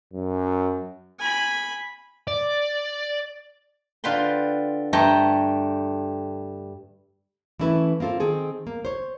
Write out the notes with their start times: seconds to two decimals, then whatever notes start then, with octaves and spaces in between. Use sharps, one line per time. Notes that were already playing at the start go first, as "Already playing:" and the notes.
0.13 F#2
1.19 G#5 B5
2.28 D5
4.04 D3 F4 B4 G5 C6
4.93 G2 A3 G4 G5 A#5
7.59 E3 A3 C#4 E4 A4 B4
8.00 A#3 C4 F4 A4 C5
8.20 D#3 C4 G#4 A4
8.67 A#3
8.85 C5 C#5